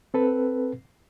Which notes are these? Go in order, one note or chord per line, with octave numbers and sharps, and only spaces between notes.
C4 A4 B4